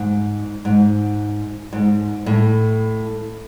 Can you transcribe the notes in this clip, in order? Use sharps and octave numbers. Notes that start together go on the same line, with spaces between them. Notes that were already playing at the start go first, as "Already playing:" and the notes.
Already playing: G#2
G#2
G#2
A2